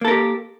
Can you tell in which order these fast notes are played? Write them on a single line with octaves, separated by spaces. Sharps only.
A#3 A4 A#4 G4